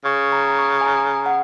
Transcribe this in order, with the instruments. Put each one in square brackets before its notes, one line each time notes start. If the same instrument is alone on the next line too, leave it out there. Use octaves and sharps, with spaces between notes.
[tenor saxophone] C#3 [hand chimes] C#6
[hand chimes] A#5
A#5
C#6
G#5
A#5
F#5